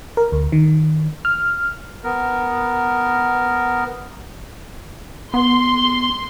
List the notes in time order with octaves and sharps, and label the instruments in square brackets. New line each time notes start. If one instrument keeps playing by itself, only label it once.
[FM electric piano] A#4
D2
D#3
F6
[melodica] B3 A#4
[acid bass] B3 [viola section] C6